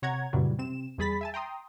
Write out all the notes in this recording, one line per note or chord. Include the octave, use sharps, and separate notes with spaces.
C3 C#5 F#5 A#5 G#6
F#2 A#2 C#3 E3 F#3 G3
C3 C4 E7
E2 G3 G#4 B5 A6 B6
E5 G#5 A5
G5 A#5 C6 D#6